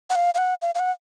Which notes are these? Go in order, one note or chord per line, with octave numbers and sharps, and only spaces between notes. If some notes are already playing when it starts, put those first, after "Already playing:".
F#5
F5
F5
F#5
F5
F5
F#5